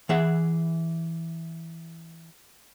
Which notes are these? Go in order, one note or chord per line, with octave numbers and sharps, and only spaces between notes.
E3 G#4 E5 F#5